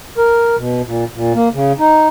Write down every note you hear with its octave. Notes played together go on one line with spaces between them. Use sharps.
A#4
B2
A#2
A#2
A#3
C#3
D#4